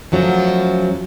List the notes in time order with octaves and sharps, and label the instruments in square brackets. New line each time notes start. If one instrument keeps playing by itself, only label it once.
[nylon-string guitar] F#2 F3 F#3 A3